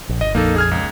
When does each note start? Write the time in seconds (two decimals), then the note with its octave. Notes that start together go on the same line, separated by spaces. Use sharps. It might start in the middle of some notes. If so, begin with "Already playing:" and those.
0.09 A#1
0.21 G1 D#5
0.35 A#1 F2 A#3 D#4 A4
0.56 G#4 F6 G#6
0.71 C#2